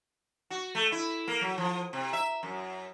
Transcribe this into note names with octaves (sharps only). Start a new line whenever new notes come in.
F#4
A3
E4
A#3
F#3
F3
C3
E5
F#2